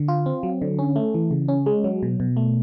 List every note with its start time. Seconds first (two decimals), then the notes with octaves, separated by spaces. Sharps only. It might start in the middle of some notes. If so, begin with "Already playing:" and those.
Already playing: D3
0.08 F4
0.26 C4
0.43 F#3
0.62 D3
0.79 C#4
0.96 A3
1.14 E3
1.31 C#3
1.48 C#4
1.66 G#3
1.84 F#3
2.03 B2
2.20 B2
2.37 A3